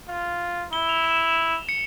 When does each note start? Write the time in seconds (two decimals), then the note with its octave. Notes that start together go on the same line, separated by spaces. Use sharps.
0.08 F4
0.73 E4 G7
0.89 F7
1.04 E7
1.69 C#7